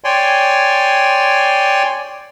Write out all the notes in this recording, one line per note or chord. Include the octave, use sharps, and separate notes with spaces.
C#5 D5 G5 G#5 C6